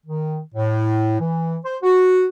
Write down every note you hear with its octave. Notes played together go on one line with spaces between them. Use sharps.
D#3
A2
E3
C5
F#4